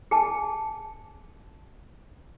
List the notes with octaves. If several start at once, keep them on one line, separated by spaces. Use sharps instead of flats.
G#4 G#5 A5